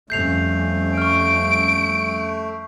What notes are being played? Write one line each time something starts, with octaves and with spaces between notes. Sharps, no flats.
F2 G3 A3 C#4 G6 C7 F7
C#6 F6 D7